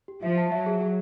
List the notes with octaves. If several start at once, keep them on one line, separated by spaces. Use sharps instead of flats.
G4
F3 E5
A5
F#3 E5
G#4
G#4